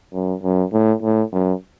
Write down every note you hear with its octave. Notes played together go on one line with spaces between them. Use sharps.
F#2
F#2
A2
A2
F#2